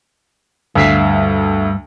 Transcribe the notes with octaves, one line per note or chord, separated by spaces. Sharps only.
D2 G2 E5 F5